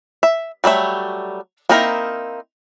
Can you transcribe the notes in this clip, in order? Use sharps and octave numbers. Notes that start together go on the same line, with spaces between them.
E5
F#3 G3 A3 E5
A#3 C4 D#4 E4 A#4